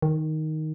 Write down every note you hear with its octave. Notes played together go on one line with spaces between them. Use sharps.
D#3